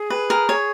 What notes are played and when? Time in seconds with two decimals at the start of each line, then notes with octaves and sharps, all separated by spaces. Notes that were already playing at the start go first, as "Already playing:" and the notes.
Already playing: G#4
0.10 B4
0.30 A#4
0.49 C#5